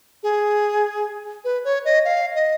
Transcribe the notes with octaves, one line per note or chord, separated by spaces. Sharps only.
G#4
B4
C#5
D#5
F5
D#5